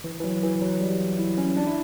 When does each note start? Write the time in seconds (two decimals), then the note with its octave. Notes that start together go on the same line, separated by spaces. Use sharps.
0.04 E3
0.20 E3
0.24 F#3
0.43 E3
0.62 F#3
0.81 G3
1.19 E4
1.38 C#4
1.57 D4
1.67 E4